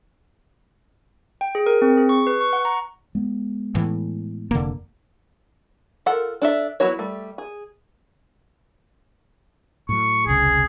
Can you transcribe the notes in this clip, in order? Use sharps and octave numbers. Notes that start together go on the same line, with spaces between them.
G5
G#4
A#4
C4
G#4
C#6
B4
C#6
F#5
A#5
G#3 B3
A2 E3
F1 D3 A#3
F4 A4 A#4 F#5
D4 A4 E5
F#3 B3 E4 F#4 C#5
G3 A3
G#4
A2 F#3 C#6
E1 C2 C#3 G#4